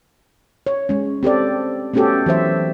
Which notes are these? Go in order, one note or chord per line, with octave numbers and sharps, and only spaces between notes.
C#5
G#3 C#4
C4 G4 A4 D5
A3 B3 C#4 F#4 G4 A4
E3 F#3 C5 E5